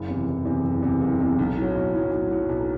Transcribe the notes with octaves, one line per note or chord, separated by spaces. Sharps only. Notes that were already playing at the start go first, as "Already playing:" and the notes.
Already playing: F#1
E2 C3
F#1
E2 C3
F#1
E2 C3
F#1
E2 C3
B1
A2 F#3
B1
A2 F#3
B1
A2 F#3
B1